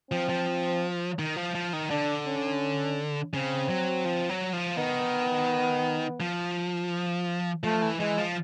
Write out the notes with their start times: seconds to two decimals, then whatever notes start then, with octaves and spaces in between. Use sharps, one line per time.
0.11 F3 C4
0.29 F3
1.19 D#3
1.36 F3
1.55 F3
1.73 D#3
1.90 D3 D4
2.26 C#4
3.34 C#3 C4
3.70 F#3
4.05 F3
4.29 F#3
4.53 F3
4.77 D#3 B3
6.21 F3
7.64 F3 A3
7.82 E3
7.99 E3 G#3
8.18 F3